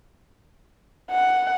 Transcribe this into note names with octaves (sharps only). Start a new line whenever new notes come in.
F#5